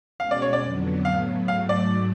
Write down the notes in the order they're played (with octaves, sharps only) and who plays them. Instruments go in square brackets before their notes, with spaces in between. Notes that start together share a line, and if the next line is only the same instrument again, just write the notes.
[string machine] B2 G#3 C#4 [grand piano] F5
[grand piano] D5
C#5
D5
[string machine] F2 D3 F#3 B3 D4
[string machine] A2 F#3 B3 [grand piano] F5
[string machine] G#2 F#3 A3 [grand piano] F5
[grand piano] D5